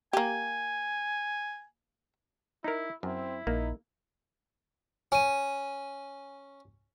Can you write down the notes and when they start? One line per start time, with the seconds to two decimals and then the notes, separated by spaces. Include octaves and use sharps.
0.13 A#3 G4 G#5
2.64 D#4 E4 A#4
3.03 F#2 C4 E4
3.47 A#1 A#3 D#4
5.12 C#4 G#5 D#7